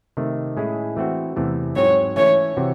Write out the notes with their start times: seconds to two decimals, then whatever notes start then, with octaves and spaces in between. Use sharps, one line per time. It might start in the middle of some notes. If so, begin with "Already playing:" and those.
0.17 C3 D#3 A3
0.57 A2 G#3 C#4 E4 G#4
0.96 E3 A3 C4 F#4
1.36 E2 C3 E3 A3
1.76 G#2 F#3 C4 C#5
2.16 E3 A3 C#4 C#5
2.57 C3 E3 C4 F#4